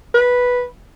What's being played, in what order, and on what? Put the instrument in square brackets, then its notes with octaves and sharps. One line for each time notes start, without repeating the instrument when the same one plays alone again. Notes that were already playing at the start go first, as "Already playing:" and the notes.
[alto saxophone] B4